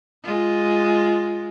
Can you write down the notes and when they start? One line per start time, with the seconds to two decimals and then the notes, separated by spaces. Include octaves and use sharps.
0.24 G#3 F4